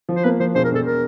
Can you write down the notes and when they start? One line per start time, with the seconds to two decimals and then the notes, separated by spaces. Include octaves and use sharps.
0.09 F3
0.16 C5
0.24 A#3 B4
0.40 F3 C5
0.54 E1 C5
0.65 A#4
0.71 E1 A4
0.86 A#4